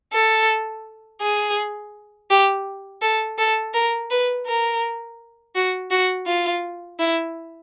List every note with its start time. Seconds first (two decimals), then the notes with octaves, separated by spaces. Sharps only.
0.13 A4
1.21 G#4
2.30 G4
3.02 A4
3.38 A4
3.74 A#4
4.11 B4
4.47 A#4
5.55 F#4
5.91 F#4
6.27 F4
6.99 E4